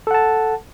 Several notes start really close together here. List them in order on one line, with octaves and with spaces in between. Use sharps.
A4 F#5 A5